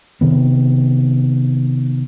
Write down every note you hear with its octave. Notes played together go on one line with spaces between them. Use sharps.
C3 D#3 B3